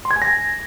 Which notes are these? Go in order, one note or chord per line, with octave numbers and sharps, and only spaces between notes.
C6
G#6
G#5
A#6
G#5